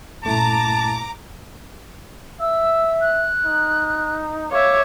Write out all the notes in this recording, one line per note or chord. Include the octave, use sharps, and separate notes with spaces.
G2 A#2 C#3 A3 E4 A5 A#5 D6
E5 E6
F#6
D#4
C#5 E5 F5 D6